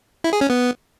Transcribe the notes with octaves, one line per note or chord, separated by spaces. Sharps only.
E4
G#4
C#4
B3